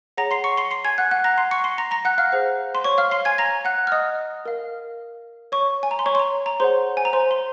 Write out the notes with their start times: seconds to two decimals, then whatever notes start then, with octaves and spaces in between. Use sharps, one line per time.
0.17 G#4 C#5 F#5 A#5 A#6
0.31 C6 C7
0.44 C#6 C#7
0.57 C6 C7
0.71 C6 C7
0.85 G#5 G#6
0.98 F#5 F#6
1.11 F#5 F#6
1.24 A#5 A#6
1.38 C6 C7
1.51 C#6 C#7
1.64 C6 C7
1.78 A#5 A#6
1.91 A#5 A#6
2.05 F#5 F#6
2.18 F5 F6
2.31 G#4 C5 F#5
2.75 C6
2.84 C#5 C#6
2.98 F5 F6
3.11 C6 C7
3.25 G#5 G#6
3.38 A#5 A#6
3.65 F#5 F#6
3.87 F6
3.92 D#5 D#6
4.46 A#4 F5
5.52 C#5 C#6
5.83 G#5
5.91 A#5
5.99 C6
6.06 C#5 C#6
6.15 C6
6.20 A#5
6.46 A#5
6.60 G#4 C5 C#5 F#5 C6
6.97 G#5
7.05 A#5
7.13 C5 C6
7.31 C6